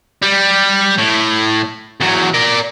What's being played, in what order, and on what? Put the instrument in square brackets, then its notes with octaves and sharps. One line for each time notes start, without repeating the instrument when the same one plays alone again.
[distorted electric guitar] G3
A2
E2 F#3
A#4 D5